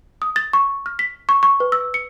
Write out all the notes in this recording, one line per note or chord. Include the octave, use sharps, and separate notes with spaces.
D#6
A6
C#6
F6
B6
C#6
C#6
B4
E6
C#7